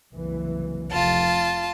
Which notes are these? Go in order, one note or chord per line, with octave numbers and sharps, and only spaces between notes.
F#1 C2 E3
F1 F4 A5